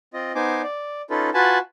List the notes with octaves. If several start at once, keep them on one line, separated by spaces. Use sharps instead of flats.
C4 F4 D#5
B3 D#4 C5 G#5 D6
D5
C#4 D#4 F4 A4 B4
F4 F#4 B4 G#5 A5 B5